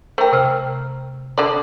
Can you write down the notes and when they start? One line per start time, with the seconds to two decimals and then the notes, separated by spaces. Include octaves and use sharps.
0.18 A3 A#4 C5 G5
0.33 C3 C5 F6
1.38 D3 D5